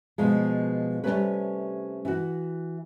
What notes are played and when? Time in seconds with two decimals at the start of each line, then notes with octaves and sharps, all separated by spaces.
0.18 B2 F3 G#3
1.04 C3 F#3 G3 A3 C#4 B4
2.05 E3 F#4